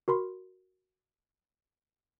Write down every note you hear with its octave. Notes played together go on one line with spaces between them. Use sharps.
F#4 A#4 B5 C6